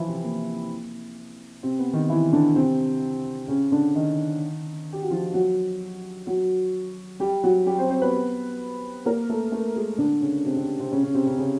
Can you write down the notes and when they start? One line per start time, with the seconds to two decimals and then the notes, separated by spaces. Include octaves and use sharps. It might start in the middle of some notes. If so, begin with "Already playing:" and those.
Already playing: E3 F3 E4 F4
0.08 C3 C4
0.24 A#3
1.63 C3 C4
1.79 B3
1.93 D#3 D#4
2.09 E3 E4
2.32 D3 D4
2.56 C3 C4
3.48 C#3 C#4
3.72 D3 D4
3.95 D#3 D#4
4.93 G4
5.02 F#4
5.11 F3 F4
5.34 F#3 F#4
6.27 F#3 F#4
7.20 G3 G4
7.43 F#3 F#4
7.66 G3 G4
7.78 C4 C5
7.90 C4 C5
8.01 B3 B4
9.05 A#3 A#4
9.30 A3 A4
9.52 A3 A4
9.76 G#3 G#4
9.98 D3 D4
10.22 C#3 C#4
10.45 C3 C4
10.56 C3 C4
10.80 C3 C4
10.92 C#3 C#4
11.03 C#3 C#4
11.14 C3 C4
11.27 C#3 C#4
11.38 C#3 C#4